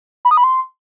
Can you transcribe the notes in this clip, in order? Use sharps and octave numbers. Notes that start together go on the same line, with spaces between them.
B5
D#6
B5
C6